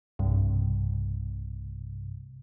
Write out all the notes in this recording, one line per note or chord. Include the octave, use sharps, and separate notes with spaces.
B1 G2 C3